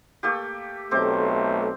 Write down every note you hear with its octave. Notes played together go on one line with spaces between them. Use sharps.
A3 A#3 G4
B1 A3 C4 C5 D6